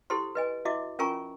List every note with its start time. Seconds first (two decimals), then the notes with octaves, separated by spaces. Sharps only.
0.10 E4 G4 A4 C5 C6
0.35 B4 D#5 G#5
0.65 E4 F#4 D#5 E5 D6
0.99 C#4 F4 A#4 G#5 A#5 C#6